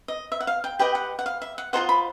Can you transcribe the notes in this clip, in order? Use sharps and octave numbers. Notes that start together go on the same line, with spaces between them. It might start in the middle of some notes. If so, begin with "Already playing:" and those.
D#5
E5
F#5
F5
G5
G4 B4 D#5 G5
F#5
F#5
F5
E5
F#5
F4 A4 C5 D#5 F#5
B5